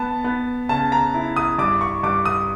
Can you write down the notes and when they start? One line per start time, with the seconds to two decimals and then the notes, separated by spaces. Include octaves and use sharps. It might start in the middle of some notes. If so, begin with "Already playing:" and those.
Already playing: B3 A5
0.24 B3
0.69 C#3 A5
0.92 A#5
1.14 E4
1.36 D#6
1.58 G2 D6
1.81 C#6
2.03 G2 D6
2.25 D#6